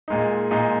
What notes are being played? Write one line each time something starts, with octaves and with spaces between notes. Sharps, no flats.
A#2 G#3 D#4
A#2 G#3 D#4